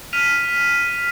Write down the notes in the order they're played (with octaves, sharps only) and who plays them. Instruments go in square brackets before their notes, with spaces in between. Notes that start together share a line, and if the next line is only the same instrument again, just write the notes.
[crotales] F6 B6 D#7 F7